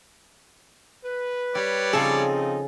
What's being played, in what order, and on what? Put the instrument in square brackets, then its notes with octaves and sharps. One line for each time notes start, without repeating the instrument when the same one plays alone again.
[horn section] B4
[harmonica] G3 C#5 D5 [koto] G4
[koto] C#3 A4 [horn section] F3 C4 D#4 [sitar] G#4